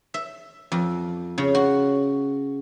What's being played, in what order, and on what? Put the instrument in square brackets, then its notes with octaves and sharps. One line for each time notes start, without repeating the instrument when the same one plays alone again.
[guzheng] E5
F2
C#3
F#4